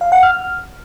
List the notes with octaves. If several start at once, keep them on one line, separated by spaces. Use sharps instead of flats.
F5
F#5
F6